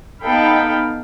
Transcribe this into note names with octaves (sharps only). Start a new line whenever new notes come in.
B3 D#4 A4 F5 G5 B5